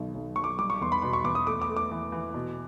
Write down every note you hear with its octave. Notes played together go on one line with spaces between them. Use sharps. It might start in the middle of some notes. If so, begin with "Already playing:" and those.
Already playing: B1 B2 D#3
B1
B1 C#6
D6
G3 D6
C#6
E2 C6
B5
B2 C6
C#6
E2 D6
D#6
A3 D6
D6
A3
D6
E3
E3
B2